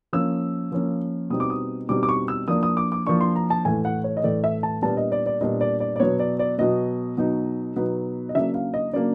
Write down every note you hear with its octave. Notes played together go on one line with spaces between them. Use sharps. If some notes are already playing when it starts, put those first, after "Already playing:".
F3 A#3 C#4 E6
F3 A#3 C#4
B2 G3 C4 D#4 D#6
D6
D#6
B2 G3 C4 D#4 D6
D6
C#6
E6
F3 A#3 D4 D#6
D#6
D6
D6
F3 A#3 D4 C#6
C6
A#5
A5
A2 E3 A3 G#5
F#5
C#5
D#5
A2 E3 A3 D5
E5
A5
A#2 G3 B3 D4 A5
D#5
D5
D5
A#2 G3 B3 D4 D#5
D5
D5
D5
B2 F#3 B3 C#5
D5
D5
B2 F#3 B3 D#5
B2 F#3 B3 D#4
B2 F#3 B3 D#4
D#5
C#3 F#3 A#3 D4 E5
F5
D#5
C#3 F#3 A#3 D4 D5